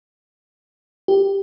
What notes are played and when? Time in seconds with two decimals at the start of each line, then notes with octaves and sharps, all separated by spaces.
1.08 G4